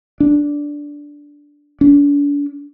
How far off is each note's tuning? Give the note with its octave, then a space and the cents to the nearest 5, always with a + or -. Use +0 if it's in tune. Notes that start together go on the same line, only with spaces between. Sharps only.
D4 -10
D4 -40